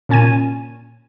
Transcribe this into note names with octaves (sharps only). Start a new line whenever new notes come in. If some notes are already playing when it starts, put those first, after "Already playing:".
A#2 C#4 G#5 G#6 D#7